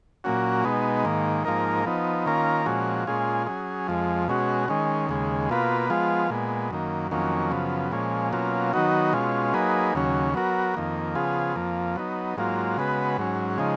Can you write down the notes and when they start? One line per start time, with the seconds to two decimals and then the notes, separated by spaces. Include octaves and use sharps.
0.24 A#2 F#3 A#3 C#4 F#4
0.64 B2 G#3 B3 D#4
1.05 G#2 D#3 A#3
1.45 G#2 F3 A#3 D#4 A#4
1.86 F3 B3 D#4
2.26 D#3 A#3 C#4 F4 A#4
2.66 A#2 F3 G#3 C#4 F#4
3.07 A#2 G#3 C#4 F4 G#4
3.47 F#3 C#4 G#4
3.88 F2 F3 G#3
4.28 B2 G#3 C#4 F#4
4.68 D#3 G#3 C#4
5.09 D#2 C#3 G#3
5.49 B2 A#3 F4 B4
5.90 F3 G#3 B3 F4
6.30 A#2 G#3 B3
6.71 F#2 D#3 A#3
7.11 F2 D#3 F#3 A#3 C#4
7.51 F#2 C#3 F3 B3
7.92 A#2 F3 G#3 C#4
8.32 B2 F#3 A#3 C#4 F4
8.73 D#3 F#3 B3 D#4 F#4
9.13 B2 G#3 C#4 F4
9.53 F#3 A#3 D#4 G#4 B4
9.94 D#2 C#3 F#3 C#4
10.34 F#3 B3 F#4 A#4
10.74 F2 D#3 A#3
11.15 C#3 F3 B3 F4 G#4
11.56 F2 F3 A#3
11.96 F#3 B3 D#4
12.37 G#2 F#3 A#3 F4
12.77 C#3 G#3 B3 F#4 B4
13.18 G#2 F#3 C#4
13.58 C#3 F3 G#3 D#4